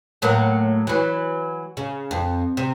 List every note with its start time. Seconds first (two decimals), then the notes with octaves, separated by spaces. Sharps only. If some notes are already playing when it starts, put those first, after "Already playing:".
0.22 A2 F#3 A#3
0.87 E3 F#3
1.77 C#3
2.11 F2
2.57 C3